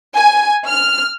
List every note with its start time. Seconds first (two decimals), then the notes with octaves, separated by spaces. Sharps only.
0.15 G#5
0.67 F6